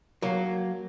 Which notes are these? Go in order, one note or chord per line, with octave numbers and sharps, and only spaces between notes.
F#3 A#3